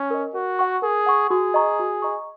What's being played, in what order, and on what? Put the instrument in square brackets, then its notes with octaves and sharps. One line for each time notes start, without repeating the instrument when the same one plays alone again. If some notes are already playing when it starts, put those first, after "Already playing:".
Already playing: [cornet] C#4
[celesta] A#4 D#5
[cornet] F#4 [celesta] A#4
[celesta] F#5 C#6
[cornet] G#4 [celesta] A#4
[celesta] F#5 C#6
[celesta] F#4 [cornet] G#4
[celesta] D#5 A#5 C#6
F#4
D#5 A#5 C#6